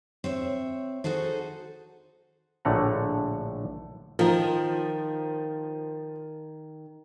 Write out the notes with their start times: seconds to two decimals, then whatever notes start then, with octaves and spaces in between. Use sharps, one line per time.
0.24 C4 C#5 E5
1.04 D#4 F#4 G#4 A4 C5
2.65 A#1 A2 D3 A3 F#5 A#5
4.19 D#3 F3 A#4